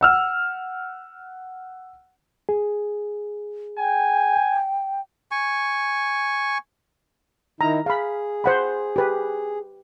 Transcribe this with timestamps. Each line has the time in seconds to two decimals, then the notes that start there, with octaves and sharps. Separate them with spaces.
0.01 F#5 E6 F6
2.49 G#4
3.78 G5 G#5
5.31 G#5 C#6
7.61 D#3 D#4 E4 A#5
7.86 G#4 F5 B5
8.44 C5 F#5 B5
8.96 G4 B4